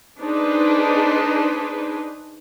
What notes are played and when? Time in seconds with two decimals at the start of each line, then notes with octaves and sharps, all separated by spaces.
0.20 D4 D#4 G#4 B4 C5